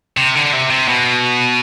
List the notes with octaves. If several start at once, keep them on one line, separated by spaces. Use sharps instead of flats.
C3
D3
C3
C3
B2